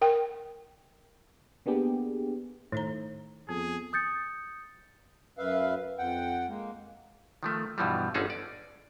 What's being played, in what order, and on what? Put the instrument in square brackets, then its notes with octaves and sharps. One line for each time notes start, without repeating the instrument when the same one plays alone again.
[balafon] A#4 G5
[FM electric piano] A#3 B3 D4 G4 G#4
[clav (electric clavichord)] A2 [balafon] D#3 D#4 A#5
[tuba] F2 [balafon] B3 [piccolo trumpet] G#4
[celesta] D#6 G6 A6 C#7
[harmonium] F#2 B4 E5 F5
F2 F#5 G5
G#3 A#3
[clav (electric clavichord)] D#3 F3 A3
G2 B2 E3 F3 G3
G1 D3 C#4 D#4 G#4 A4
D5